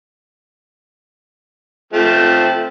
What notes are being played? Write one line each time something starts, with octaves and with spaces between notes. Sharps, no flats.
F3 A3 C4